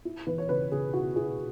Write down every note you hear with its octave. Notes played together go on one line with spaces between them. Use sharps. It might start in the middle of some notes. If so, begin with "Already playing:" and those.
E4
E3 B4
C#5
C#3 B4
C#3 G#4
E4 F#4
E4 G#4